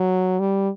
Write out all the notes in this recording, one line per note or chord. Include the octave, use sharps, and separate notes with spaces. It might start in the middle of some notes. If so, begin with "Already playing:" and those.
Already playing: F#3
G3